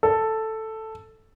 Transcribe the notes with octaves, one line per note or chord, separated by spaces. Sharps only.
A4